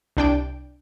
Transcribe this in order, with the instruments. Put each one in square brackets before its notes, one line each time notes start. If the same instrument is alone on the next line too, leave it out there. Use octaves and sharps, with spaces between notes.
[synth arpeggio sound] C2 D4 G5 D7